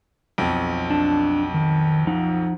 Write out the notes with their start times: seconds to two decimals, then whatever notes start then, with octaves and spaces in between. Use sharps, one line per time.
0.38 B1 F2
0.90 D4 A5
1.54 D#3
2.07 F3 D#4 F#5